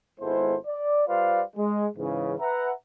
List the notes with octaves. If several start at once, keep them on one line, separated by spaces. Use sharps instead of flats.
G#1 G#3 B3 E4 A4 C5
D5
G3 F4 B4 C5 D5 F5
G#3
G#2 C#3 E3
B4 E5 F#5 A#5